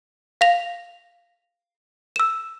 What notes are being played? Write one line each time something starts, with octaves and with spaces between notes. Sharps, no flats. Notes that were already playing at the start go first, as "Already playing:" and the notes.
F5 A#6 F7
E6 E7